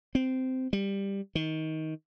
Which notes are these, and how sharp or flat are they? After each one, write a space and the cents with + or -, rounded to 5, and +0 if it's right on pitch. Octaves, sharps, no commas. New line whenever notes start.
C4 -15
G3 +10
D#3 +20